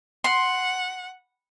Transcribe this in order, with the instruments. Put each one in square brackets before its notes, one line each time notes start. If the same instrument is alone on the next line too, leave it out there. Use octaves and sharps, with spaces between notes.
[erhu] F#5 [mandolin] C6